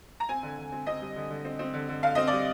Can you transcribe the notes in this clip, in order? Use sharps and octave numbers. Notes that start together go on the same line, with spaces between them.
A#5
C4 G#5
D3
D3
C4
C4 D#5
G3
D3
D3
C4
C4
D3
D3
D3 F5
C4 D#5
G3 D5